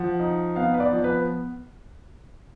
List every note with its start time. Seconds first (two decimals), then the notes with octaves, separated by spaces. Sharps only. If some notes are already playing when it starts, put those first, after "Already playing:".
Already playing: F3 F#5
0.19 D#4
0.56 B3 F5
0.74 B4
0.80 D5
0.91 F3
1.04 B4